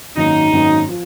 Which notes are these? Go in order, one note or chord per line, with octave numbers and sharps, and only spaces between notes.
G#1 F#2 D#3 F#3 A#3 D#4
G#1 F#2 D#3 F#3 A#3
F3